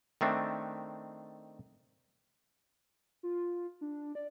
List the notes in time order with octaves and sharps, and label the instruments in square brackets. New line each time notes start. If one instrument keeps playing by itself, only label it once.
[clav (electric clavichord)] D#3 A3 C4 D4
[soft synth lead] F4
D4
D5